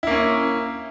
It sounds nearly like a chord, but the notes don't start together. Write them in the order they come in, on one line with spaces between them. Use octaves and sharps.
E4 A#3 C#4